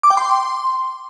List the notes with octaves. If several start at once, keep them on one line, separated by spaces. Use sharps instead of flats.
D6
G5
C6